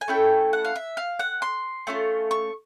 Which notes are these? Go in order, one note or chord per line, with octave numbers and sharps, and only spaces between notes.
G#5
A3 C#4 E4 A4 G5
F#5
F5
E5
F5
F#5
C6
A3 C#4 F4
C#6